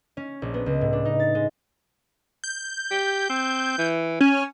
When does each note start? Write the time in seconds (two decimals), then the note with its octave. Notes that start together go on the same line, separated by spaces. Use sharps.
0.17 C#4
0.42 A#1
0.54 B3
0.66 C#2
0.81 A2
0.93 D4
1.05 D#4
1.20 A6
1.35 G#3
2.44 G6
2.91 G4
3.29 C4
3.78 E3
4.20 C#4 G#5